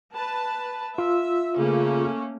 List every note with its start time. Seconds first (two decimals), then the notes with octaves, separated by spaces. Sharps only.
0.15 B4 A5
0.98 F4 E5
1.58 C#3 A3 A#3 C#4